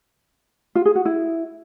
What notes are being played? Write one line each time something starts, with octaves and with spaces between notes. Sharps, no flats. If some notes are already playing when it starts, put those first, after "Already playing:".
F4
G#4
F#4
E4